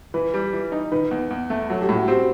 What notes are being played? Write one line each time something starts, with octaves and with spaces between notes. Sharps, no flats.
E3 B4
G3
E3
D#4
D#3 B4
E2
E2
A3
F#3 A4
G4
A2
F#4
C4 G4